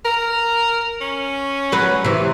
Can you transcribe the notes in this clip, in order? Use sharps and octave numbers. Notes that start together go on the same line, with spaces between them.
A#4
C#4
F#3 B4
C3 E3